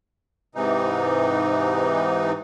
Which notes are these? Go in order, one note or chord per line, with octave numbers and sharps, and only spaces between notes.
G#2 C3 E3 D#4